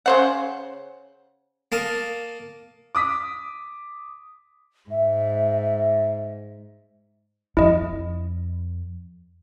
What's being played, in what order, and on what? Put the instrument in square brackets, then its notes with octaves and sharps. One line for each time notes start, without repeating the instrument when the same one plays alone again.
[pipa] C#3 C5 F#5
[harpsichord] A#3 A#4 A5 D#6
[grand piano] D6 D#6 B6
[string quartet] G#2 [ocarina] E5
[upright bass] F2 [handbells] E4 D#5